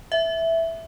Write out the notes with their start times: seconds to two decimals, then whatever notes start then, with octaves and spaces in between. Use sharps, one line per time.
0.12 E5